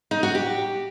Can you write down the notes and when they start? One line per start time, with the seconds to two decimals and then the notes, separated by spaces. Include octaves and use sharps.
0.11 D#4
0.23 F#4
0.35 G4